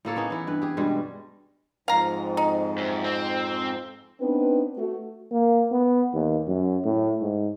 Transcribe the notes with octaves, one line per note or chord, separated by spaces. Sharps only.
A2 A#3 A4 C#5
B3 C#4 D#4 G#4
E3 E4
G2 B4
G4 G#4
G2 B2 G3 G#3
F2 G#2 F5 A#5
D#4
F#2
C4
B3 C4 D4 D#4 B4
A3 F#4
A#3
B3
D#2
F#2
A2
G#2